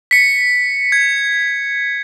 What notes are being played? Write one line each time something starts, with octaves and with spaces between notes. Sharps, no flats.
B6 C#7
G#6